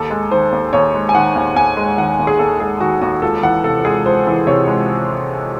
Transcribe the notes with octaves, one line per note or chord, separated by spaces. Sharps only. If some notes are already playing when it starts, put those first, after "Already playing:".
Already playing: D#2 A4
G#3
D#3 C5
D#2
D#2 C#5
G#3
G#5
D#3 F#5
D#2
D#2 G#5
G#3
D#3 F#5
D#2
G#4
D#2 A4
G#3 G#4
D#3 F#4
D#2 F#4
C#2 A4
E3 F#5
C3 A4
G#3 G#4
C#2 C5
E3
C3 C#5
G#3